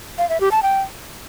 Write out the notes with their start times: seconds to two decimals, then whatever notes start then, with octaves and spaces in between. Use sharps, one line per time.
0.18 F5
0.29 E5
0.40 G4
0.52 A5
0.63 G5